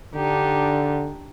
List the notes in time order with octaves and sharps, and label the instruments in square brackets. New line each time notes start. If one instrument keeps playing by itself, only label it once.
[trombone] D3 [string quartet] D4 D#4 G4